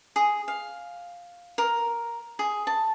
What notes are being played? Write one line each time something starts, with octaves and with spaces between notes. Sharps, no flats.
G#4
F5
A#4
G#4
A5